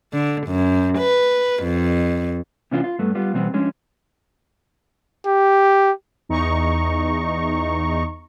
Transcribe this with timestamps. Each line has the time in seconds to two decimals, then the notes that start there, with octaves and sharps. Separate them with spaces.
0.13 D3
0.47 F#2
0.98 B4
1.63 F2
2.71 C3 E3 B3 C#4 D4 F4
2.84 F4
2.99 G2 A3 B3
3.15 G3 B3 F4
3.33 B2 E3 G3 B3 C4
3.53 F3 G#3 C#4 D4
5.26 G4
6.29 E2 D#4 A#5 C#6